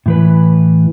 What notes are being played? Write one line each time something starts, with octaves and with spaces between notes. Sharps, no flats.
A2 E3 B4